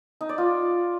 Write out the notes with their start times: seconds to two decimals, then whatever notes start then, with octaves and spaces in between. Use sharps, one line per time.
0.21 D#4
0.29 D5
0.38 F4